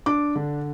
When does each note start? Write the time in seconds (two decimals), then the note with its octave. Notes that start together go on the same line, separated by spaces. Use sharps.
0.06 D4 D6
0.36 D3